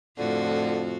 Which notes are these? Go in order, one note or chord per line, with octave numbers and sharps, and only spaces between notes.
F2 A2 D3 F4 F#4